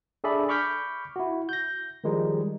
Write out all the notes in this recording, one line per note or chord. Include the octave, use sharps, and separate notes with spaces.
D4 G#4 A4 D5 E5 B5
B5 C#6 D6 F6 G6 B6
E4 F#4
G6 A#6
D#3 F3 G3 G#3 D#4